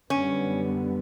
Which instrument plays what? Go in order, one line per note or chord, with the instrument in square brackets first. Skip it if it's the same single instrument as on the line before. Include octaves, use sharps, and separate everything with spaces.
[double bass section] F#2 D3 G3 B3 [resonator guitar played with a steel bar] C#4